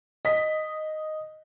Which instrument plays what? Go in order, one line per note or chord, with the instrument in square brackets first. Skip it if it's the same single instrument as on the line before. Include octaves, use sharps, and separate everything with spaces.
[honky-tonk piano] D#5 B6